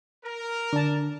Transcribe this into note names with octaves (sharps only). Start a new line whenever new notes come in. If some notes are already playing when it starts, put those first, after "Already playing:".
A#4
D3 D4 A5